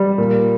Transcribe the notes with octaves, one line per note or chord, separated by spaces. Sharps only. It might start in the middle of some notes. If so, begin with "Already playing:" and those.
Already playing: G3
A#2